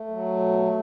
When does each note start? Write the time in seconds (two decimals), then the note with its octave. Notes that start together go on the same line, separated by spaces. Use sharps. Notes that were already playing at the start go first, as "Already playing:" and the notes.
Already playing: A3
0.11 F#3
0.39 B2